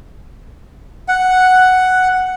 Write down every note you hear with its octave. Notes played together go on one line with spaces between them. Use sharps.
F#5